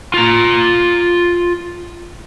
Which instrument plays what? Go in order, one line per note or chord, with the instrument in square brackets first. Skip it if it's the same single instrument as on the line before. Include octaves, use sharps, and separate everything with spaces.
[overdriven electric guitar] F4 A#5